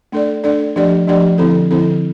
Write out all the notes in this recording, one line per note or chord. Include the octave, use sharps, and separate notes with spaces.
A3 D4 A4 D5
A3 D4 A4 D5
F3 A3 D4 G4 D5
F3 A3 D4 G4 D5
D3 F3 C4 E4 A4
D3 F3 C4 E4 A4